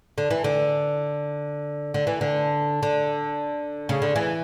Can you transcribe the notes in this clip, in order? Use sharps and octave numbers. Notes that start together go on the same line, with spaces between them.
D3
E3
D3
D3
E3
D3
D3
C#3
D3
E3